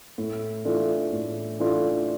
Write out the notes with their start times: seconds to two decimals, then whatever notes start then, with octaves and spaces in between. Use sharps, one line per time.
0.18 A2
0.65 E3 A3 D4 F4
1.12 A2
1.60 E3 A3 D4 F4